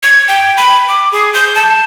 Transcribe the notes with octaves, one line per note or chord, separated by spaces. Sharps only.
G#6
G5
B5
D6
G#4
G6
A5